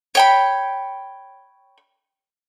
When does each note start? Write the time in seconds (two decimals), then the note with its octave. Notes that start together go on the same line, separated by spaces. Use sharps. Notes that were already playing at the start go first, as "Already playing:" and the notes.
0.15 C#5 G5 B5